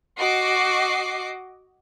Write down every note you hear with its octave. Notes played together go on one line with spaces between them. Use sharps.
F#4 D#5 D6 C7